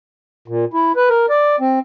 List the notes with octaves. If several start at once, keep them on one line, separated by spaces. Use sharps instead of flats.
A#2
E4
B4
A#4
D5
C4